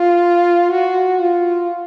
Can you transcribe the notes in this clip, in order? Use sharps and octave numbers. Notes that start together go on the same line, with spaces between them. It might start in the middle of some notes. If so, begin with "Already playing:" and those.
Already playing: F4
F#4
F4